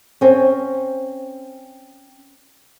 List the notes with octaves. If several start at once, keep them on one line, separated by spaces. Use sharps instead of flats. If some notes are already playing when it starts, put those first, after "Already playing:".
C4 C#4